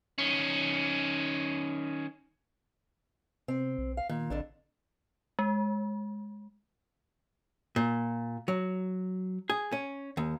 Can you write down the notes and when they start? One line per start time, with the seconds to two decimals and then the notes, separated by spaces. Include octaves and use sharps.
0.18 D#3 C#4
3.48 C3 C4
3.78 B1
3.97 F5
4.09 A#2 D#3
4.30 A1 F2 D3 D4
5.39 G#3
7.76 A#2
8.48 F#3
9.50 G#4
9.72 C#4
10.17 D#2